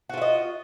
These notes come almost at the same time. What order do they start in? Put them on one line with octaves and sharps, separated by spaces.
F#4 F4 E5 D#5